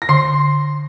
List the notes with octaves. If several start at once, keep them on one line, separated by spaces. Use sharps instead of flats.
A#6
D3 C6 C7